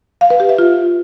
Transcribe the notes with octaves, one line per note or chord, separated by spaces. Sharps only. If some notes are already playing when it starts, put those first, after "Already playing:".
F5
B4
G4
E5
F4